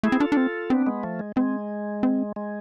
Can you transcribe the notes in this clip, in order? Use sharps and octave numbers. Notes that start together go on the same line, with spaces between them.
A3 E4 G#4
C4
D4 F4 A4
D4
C4
B3 C4 D4
G#3 B3
F3 A3
G#3
G#3 C4
C4
G#3